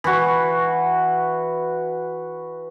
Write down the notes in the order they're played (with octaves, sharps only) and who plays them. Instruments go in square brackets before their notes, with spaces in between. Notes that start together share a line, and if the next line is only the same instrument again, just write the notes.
[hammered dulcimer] E3 F#4